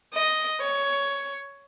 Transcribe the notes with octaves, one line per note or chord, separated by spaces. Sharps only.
D#5
C#5